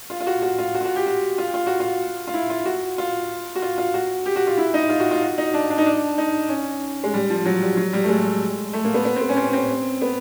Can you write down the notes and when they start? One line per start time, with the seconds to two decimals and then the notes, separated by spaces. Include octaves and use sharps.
0.10 F4
0.20 F4
0.27 F#4
0.42 F#4
0.59 F4
0.75 F#4
0.81 F4
0.85 F#4
0.96 G4
1.06 F#4
1.38 F4
1.54 F4
1.67 F#4
1.80 F4
2.27 F4
2.34 E4
2.50 F4
2.66 F#4
2.98 F4
3.56 F#4
3.62 F4
3.78 F4
3.94 F#4
4.26 G4
4.36 F#4
4.47 F4
4.58 E4
4.74 D#4
4.89 F4
5.00 F#4
5.11 F4
5.22 F#4
5.38 D#4
5.54 D4
5.70 D4
5.78 D#4
5.86 D4
6.18 D#4
6.49 C#4
7.04 G#3
7.14 G3
7.30 F3
7.45 F#3
7.62 G3
7.77 F#3
7.93 G3
8.04 A3
8.09 G#3
8.73 A3
8.84 A#3
8.94 B3
9.05 B3
9.16 C4
9.21 B3
9.29 C#4
9.37 C4
9.49 C#4
9.53 C4
10.02 B3